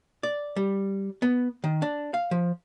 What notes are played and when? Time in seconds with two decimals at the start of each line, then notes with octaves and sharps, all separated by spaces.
0.23 D5
0.56 G3
1.22 B3
1.64 D#3
1.82 D4
2.14 F5
2.31 F3